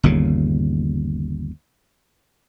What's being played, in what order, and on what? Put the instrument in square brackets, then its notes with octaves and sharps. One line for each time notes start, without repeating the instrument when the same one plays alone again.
[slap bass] G1 D#2 A#2 C#3